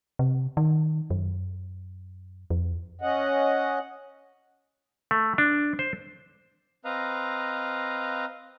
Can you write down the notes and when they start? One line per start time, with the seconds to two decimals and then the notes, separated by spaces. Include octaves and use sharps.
0.19 C3
0.57 D#3
1.10 F#2
2.50 F2
3.01 C#4 D#5 F#5
5.11 A3
5.38 D4
5.79 C5
6.85 C4 B4 D#5 F5 A#5